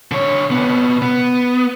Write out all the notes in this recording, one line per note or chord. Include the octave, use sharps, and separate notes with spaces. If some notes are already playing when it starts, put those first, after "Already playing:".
D3 C#5
C3 B3
B3